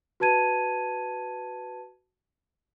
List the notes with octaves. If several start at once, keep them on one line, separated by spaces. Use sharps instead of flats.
F#4 B4 A5 G#6 D#7